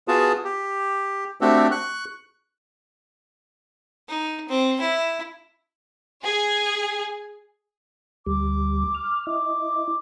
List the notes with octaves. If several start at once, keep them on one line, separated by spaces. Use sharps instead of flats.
B3 F4 F#4 G#4 A5
G4
A3 C4 D4 F#4 G4 A4
C#6 F#6
D#4
C4
E4
G#4
D2 G3 D6
F6
E4 D#5 D6